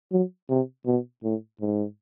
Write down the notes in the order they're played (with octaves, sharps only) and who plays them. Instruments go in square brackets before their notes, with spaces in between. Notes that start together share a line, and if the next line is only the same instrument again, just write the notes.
[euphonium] F#3
C3
B2
A2
G#2